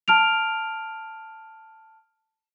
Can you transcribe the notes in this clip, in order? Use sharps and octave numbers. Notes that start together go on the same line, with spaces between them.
A5 F6 D7 F7